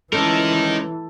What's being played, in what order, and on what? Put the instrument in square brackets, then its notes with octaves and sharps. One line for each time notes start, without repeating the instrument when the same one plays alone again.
[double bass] E3 [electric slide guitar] G#3 C#4 [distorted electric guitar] D#4 A#4 [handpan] A4